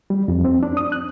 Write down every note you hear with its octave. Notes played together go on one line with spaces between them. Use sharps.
G3
F2
C4
D4
D#6
F#6